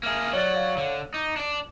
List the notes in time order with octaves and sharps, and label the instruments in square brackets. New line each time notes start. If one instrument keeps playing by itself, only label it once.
[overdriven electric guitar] A#3 G#4 [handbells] E5 F6
[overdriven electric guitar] F#3 F#4 [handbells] C#5 D5 A6
[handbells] C#5 F5
[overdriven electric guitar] D3
[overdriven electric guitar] D#4 [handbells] D6
[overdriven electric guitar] D4 D5